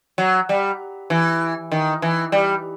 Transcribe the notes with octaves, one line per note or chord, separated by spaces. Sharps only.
F#3
G3
E3
D#3
E3
G3